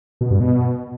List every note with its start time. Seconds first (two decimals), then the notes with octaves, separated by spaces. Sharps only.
0.21 B2
0.31 G2
0.40 B2